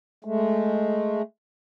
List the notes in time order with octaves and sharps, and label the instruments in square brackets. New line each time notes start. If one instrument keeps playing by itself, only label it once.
[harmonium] G#3 A3